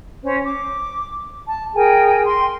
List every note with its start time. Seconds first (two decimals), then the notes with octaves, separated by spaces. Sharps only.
0.24 C#4 C5 C#5
0.44 D6
1.46 A5
1.74 G#4 A#4 G5 G#5
2.25 C6